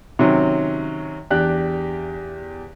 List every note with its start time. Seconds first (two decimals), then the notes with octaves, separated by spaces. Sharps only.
0.19 C3 D#3 F#3 C#4
1.30 E2 D4 G4 F#6